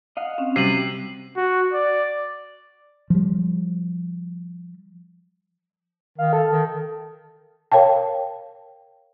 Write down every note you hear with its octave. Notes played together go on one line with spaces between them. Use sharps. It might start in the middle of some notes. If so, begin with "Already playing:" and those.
D#5 F5 F#5
C4 C#4
C3 F#3 G3 C7 D#7 F#7
F#4
D5
F3 G3
D#3 F5
A4
D#3
A#4 C#5 F5 G5 A5